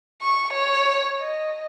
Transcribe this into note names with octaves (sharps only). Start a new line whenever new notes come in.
C#6
C#5
D#5